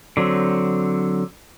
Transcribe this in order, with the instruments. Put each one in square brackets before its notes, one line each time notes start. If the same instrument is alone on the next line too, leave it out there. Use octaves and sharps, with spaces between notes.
[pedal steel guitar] D3 F#3 C4